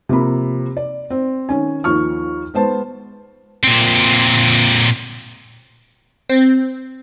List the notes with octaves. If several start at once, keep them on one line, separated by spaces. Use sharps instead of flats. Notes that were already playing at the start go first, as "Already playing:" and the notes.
C3 F3 A#3 B5
D5
C4
D#3 C#4 G#5
D#2 D#3 F3 C#6 F6
G#3 B3 C5 A5
A#2 C4
C4